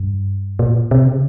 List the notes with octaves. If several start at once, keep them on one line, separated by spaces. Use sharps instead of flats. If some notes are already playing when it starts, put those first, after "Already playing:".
Already playing: G2
A#2
C3
C#3